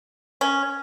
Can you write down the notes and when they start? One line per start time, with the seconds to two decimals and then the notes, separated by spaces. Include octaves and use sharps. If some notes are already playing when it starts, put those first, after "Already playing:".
0.41 C#4